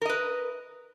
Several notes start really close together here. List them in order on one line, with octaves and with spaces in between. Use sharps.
A#4 D#5 B4